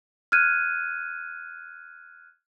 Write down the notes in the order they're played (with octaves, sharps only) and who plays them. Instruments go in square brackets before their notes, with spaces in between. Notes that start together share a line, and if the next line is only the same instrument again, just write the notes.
[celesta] F6 F#6 G#6 D#7